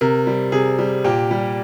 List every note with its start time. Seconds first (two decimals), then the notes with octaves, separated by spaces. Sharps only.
0.01 C3 A#4
0.27 G3
0.52 C3 G#4
0.79 G3
1.04 A#2 G4
1.31 G3